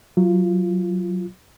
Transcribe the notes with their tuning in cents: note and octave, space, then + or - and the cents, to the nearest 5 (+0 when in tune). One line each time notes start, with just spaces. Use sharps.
F#3 +0 F4 -20